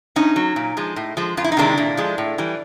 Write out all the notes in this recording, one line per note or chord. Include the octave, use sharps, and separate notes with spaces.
A2 C#4 D#4
F#3
A#2
F3 G#3
A2
F3 G#3
F2 F4
E4
D#4
C3 D#3 G#3 D4 E4
A#2
F3 G#3
A2
E3 G3